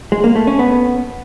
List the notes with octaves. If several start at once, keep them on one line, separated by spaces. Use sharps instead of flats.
G#3
A#3
A3
C#4
B3